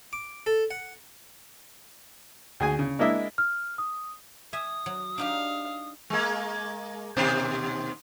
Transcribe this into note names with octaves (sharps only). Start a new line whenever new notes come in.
D6
A4
F#5
D2 G#4 G#5
C#3
G#3 A#3 D4 E4 D#5 E5
F6
D#6
E5 G#5 D#6
F#3
D4 D#4 G4 F5
G#3 A#3
D#2 B2 C5